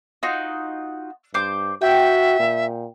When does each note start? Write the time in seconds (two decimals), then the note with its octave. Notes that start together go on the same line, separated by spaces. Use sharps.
0.23 D#4 F4 F#4
1.34 G2 C5 D6
1.81 F#4 E5 G5
2.39 A#2